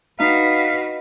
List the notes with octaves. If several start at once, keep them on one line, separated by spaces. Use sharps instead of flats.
D#4 F#4 B4 F5 B6